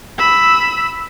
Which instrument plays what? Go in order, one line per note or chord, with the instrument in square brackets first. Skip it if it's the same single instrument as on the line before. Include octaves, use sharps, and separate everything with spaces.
[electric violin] B5 E6